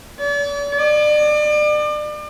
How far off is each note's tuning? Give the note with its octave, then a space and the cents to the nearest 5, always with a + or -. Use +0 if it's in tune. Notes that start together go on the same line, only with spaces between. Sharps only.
D5 -45
D5 +35